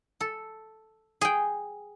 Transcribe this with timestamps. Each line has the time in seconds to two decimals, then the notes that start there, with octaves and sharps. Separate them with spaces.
0.21 A4
1.21 G#4 G5